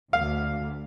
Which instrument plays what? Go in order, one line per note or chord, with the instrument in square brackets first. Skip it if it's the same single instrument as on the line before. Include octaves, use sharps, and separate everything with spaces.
[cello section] D2 [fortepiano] F5